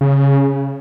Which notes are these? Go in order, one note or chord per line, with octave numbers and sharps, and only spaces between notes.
C#3